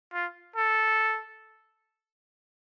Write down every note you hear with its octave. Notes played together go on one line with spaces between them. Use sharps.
F4
A4